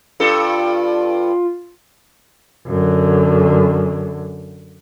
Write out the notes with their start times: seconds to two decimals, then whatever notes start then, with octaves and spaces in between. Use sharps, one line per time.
0.20 G2 F4 A4
2.67 F#2 D3